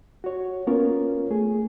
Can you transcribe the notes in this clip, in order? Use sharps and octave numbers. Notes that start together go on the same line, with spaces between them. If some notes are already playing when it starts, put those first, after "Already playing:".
F#4 C#5
A#3 B3 C#4 F4 A#4 C#5
A3 G#4